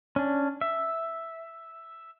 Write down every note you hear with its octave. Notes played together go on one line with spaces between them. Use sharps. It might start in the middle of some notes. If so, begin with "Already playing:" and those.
C#4 D4
E5